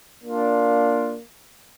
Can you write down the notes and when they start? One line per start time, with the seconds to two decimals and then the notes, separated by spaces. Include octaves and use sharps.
0.24 A#3 D4 F4